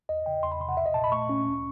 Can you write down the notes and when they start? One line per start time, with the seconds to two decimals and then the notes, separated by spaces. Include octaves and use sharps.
0.09 E2 D#5
0.26 C#3 G5
0.43 E2 C6
0.52 B5
0.60 C3 C6
0.69 F#5
0.77 B1 E5
0.86 D#5
0.94 A#2 A5
1.04 B5
1.12 A3 C#6
1.29 C#4
1.46 D2